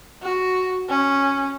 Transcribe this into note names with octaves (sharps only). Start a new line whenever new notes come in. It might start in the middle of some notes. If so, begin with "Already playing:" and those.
F#4
C#4